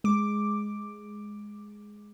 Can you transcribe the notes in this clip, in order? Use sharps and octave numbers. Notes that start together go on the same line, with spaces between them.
G#3 D6